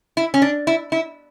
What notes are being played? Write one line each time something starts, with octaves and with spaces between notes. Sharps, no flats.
E4
C#4
D4
E4
E4